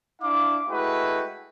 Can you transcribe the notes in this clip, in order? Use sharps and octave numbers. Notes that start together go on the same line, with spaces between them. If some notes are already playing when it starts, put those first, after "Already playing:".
D4 E4 F5 D6
G#3 A3 E4 F#4 B4 G5